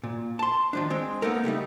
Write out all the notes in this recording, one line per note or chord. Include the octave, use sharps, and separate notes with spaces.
A#2
A5 C6
D#3 F3 D4
G#3 C4
A#3 B3 D#4 A4 A#4
C#3 G3 A3 D#4